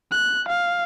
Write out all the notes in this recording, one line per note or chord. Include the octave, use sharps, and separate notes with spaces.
F#6
F5